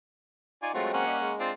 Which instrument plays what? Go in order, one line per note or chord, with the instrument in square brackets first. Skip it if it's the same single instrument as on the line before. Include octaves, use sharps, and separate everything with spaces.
[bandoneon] D#4 C#6 [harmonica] F4 D5 G#5
[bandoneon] F#3 G#3 C4 [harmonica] A3 F4 F#4
[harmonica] A#3 C#4 F#5
[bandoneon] G3 G4 D#5
G#3
[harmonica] C4 D4 F4